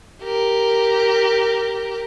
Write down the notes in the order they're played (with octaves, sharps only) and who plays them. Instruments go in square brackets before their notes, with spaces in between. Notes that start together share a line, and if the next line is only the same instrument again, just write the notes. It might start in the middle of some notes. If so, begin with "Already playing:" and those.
[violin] G4 A#4